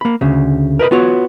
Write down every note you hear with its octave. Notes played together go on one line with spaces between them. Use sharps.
A#3 B5
D2 C#3
A#4 B4 D#5 B5
B3 F4 F#4 C#5